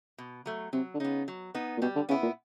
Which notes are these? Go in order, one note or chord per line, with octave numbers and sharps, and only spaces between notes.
B2
F#3 A3
C3 F#3
D3
C#3 B3 D#4
F#3
B3 D#4
A#2
B2 G3
D3
C#3 B3 E4
A#2